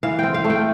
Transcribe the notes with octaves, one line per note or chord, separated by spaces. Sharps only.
E3 F5
C4 G5
F5
A3
G5